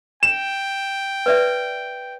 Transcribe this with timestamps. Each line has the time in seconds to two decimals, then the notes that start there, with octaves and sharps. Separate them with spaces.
0.23 G5 E7
1.26 B4 D5 E5